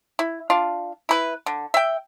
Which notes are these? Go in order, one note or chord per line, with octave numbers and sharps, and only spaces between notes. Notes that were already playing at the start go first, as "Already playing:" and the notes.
E4
D4 F4
E4 B4
D3
E5 G5